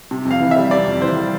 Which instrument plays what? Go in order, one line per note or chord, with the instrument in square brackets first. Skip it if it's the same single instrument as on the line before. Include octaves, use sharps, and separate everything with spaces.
[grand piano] C3
F2
F5
E3
E5
G3
C3 D5
F2
E3 C5
G3